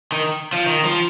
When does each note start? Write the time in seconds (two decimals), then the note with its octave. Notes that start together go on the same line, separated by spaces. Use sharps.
0.12 D#3
0.53 F3
0.67 D#3
0.85 F3